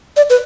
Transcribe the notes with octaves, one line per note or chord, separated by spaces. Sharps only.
D5
B4